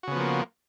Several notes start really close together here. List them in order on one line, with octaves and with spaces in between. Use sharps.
F#4 C#3 B3 F3 A#3